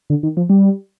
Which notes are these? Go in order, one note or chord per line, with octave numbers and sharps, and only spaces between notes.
D3
D#3
F3
G3